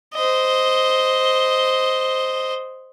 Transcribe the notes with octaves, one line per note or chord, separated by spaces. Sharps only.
C5 D#5